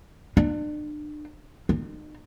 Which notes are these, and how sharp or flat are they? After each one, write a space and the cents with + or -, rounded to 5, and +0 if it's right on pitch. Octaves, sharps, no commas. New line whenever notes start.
D4 +35
D#4 -40